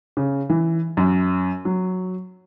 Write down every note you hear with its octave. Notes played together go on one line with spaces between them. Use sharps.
C#3
E3
F#2
F#3